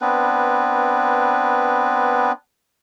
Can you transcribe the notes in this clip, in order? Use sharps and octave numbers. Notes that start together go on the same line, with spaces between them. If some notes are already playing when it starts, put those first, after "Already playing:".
B3 C4 D4 B4